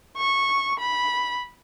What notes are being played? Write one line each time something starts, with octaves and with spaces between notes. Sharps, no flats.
C#6
B5